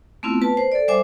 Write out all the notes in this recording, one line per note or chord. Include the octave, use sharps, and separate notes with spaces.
A3 B3 C4 E4 F4
B4 A5
C5
A4 D5
G3 C5 E5 G#5 D6